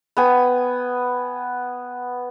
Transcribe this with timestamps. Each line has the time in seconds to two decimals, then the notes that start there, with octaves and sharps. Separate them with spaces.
0.17 B3 G5 G#5